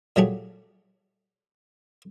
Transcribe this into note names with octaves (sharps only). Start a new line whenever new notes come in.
A#2 F#3 A3 G4 G#4